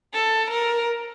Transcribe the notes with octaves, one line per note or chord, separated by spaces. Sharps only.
A4
A#4